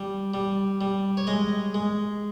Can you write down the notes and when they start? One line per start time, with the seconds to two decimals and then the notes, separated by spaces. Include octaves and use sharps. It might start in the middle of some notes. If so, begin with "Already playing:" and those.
Already playing: G3
0.34 G3
0.81 G3
1.17 C#5
1.27 G#3 D#5
1.74 G#3